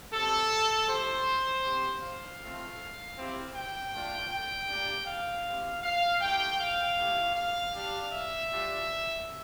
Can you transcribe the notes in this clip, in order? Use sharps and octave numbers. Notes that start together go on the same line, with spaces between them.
G3 C4 G4 A4
A3 E4 G4 C5
C4 G4
F5
A3 C4 F4
C4 E4 G4
G5
A3 D4 F4
G5
G3 A#3 D4 G4
F5
C4 E4 G4
F5
A3 E4 G4 G5
F5
A3 E4 G4
F5
G3 D4 G4
E5
G3 D4 F4